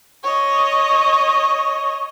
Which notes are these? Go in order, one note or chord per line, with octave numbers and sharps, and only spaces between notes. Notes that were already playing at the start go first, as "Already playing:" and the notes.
C#5 D#5